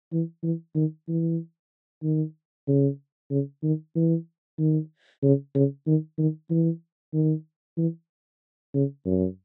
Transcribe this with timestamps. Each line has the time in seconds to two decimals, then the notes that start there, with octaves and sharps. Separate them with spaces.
0.12 E3
0.43 E3
0.75 D#3
1.08 E3
2.03 D#3
2.68 C#3
3.31 C#3
3.63 D#3
3.95 E3
4.58 D#3
5.23 C#3
5.55 C#3
5.87 D#3
6.18 D#3
6.50 E3
7.13 D#3
7.77 E3
8.74 C#3
9.06 F#2